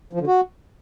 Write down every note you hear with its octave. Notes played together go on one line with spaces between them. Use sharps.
F3
D3
F#4